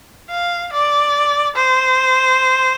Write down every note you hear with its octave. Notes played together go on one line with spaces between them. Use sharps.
F5
D5
C5